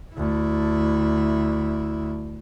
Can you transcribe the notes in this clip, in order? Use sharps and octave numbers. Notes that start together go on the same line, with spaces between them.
D2 E4